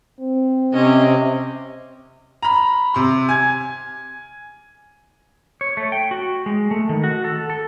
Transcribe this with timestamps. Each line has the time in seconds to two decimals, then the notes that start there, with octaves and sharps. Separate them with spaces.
0.19 C4
0.73 C3 C#4 D#5
2.42 A#5 B5
2.94 C3 C6
3.29 G#5 G#6
5.61 C#5
5.77 A3
5.92 G5
6.11 F#4
6.46 G#3
6.71 A3
6.89 D#3
7.04 F#4
7.24 A4
7.50 A4